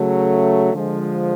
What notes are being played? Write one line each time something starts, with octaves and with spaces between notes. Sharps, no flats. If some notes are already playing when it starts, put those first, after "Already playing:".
Already playing: C#3 F#3 A3
D3 F3 G#3